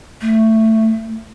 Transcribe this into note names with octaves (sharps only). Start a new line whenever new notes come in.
A3